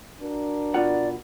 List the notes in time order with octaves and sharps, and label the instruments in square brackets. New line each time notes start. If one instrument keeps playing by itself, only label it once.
[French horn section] D4 F#4 A#4
[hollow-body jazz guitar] B2 F4 F#5 [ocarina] D5